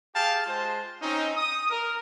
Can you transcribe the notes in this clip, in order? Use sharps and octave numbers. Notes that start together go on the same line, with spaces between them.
G4 G#4 F5 G5 A5
G#3 F4 C5 A5
C4 C#4 D#4
D#6
A#4